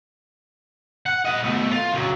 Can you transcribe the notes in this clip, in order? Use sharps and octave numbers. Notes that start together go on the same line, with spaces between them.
F#5
D#5 F#5
B2 A3
F4
C#2 F#3